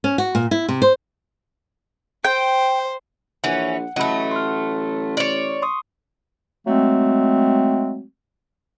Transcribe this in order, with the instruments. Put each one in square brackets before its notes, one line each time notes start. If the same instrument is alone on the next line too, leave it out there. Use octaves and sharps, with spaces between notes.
[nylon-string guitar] C#4
F#4
A#2
E4
C3
C5
[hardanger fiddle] C5 [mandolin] G5
[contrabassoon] A#1 [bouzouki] E3 C#4 [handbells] F#5
[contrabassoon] A1 [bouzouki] F#3 A3 [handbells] D#5 B5
[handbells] C6 F6
[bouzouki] C#5 D5
[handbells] C6 C#6 D#6
[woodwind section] F#3 G#3 A3 C4